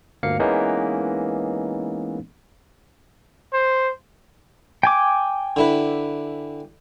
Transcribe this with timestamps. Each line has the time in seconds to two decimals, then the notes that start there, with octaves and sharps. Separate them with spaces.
0.23 G1 D2 A#3 F5 C#7
0.39 E3 G#3 A#3 B3 C#4 D#4
3.53 C5
4.83 G5 G#5 D6
5.56 D3 E4 B4